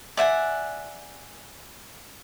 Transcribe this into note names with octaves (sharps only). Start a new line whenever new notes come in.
D5 E5 F#5 G#5